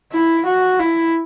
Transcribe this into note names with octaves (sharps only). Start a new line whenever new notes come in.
E4
F#4
E4